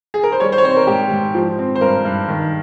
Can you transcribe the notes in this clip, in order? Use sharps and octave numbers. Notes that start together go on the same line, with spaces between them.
G#4
A#4
C5
G3 C#5
C5
C#5
C4 C5
A#4
G#2 G4
G#2
F3
C4
C5
G2 A#4
G2
D#3